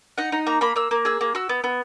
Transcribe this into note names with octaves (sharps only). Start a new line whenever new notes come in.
D#4 F#5
D#4
A#3 A#5
A#3 B5
A#3 E6
A#3
G#4 E6
A#3
F#4 E6
B3
B3